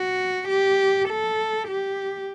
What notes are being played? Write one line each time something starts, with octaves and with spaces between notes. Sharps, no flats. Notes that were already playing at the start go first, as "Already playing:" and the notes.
Already playing: F#4
G4
A4
G4